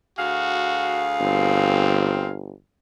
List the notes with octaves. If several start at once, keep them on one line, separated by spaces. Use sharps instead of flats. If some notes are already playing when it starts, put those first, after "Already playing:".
D2 F#4 G#4 F5
G1 C4